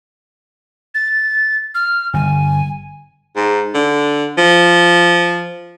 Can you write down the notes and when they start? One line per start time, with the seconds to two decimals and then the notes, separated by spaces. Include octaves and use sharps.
0.95 A6
1.75 F6
2.14 G1 G#5
3.36 G#2
3.74 D3
4.38 F3